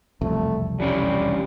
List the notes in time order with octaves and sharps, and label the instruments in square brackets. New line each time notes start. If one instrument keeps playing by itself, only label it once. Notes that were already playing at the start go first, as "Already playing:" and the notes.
[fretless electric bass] E1 C2 F2 [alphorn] A3
[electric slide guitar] E3 C#4 D4 [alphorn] G3